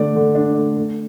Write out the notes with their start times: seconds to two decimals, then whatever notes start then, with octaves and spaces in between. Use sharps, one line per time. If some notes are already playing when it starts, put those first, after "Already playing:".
Already playing: D3 A3 D4 D5
0.15 D3
0.35 D4
0.56 A3
0.76 A3